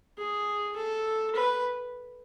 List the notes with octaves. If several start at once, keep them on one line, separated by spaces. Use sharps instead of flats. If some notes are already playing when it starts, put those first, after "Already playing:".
G#4
A4
B4